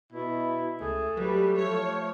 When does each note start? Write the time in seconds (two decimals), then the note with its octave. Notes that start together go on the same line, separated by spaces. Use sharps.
0.13 B2 E4
0.81 C#2 A3 G#4
1.17 F#3 G3 B4
1.58 F3 C#5